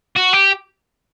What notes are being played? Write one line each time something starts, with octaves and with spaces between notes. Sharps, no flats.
F#4
G4